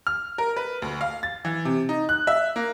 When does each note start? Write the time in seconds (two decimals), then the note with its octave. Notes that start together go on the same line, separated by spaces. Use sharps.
0.07 F6
0.38 A#4
0.56 B4
0.82 D2
1.01 F5
1.23 A6
1.45 E3
1.65 C3
1.89 D#4
2.09 F#6
2.27 E5
2.56 A#3